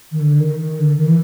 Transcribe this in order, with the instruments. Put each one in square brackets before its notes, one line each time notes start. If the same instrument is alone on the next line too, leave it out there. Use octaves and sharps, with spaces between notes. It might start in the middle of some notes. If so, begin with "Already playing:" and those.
[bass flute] D#3
D3
D#3
D#3
D3
D#3
E3